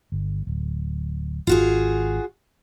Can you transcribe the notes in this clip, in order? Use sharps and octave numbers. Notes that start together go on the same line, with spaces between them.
G1
D1
G#1 F4 F#4 G#4